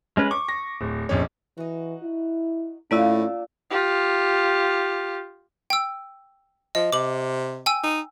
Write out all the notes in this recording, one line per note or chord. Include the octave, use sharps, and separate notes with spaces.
G#3 C#4 B4
C#6 D6
A#6
D1
A#1 F2 C#4
E3 D#4 F#4
E4
A2 A#3 C#4 D4 F4 D5 F5 E6
F4 G4
G5 E6
F3 D#5
C3 D6 F#7
G5 G#5 E6
D#4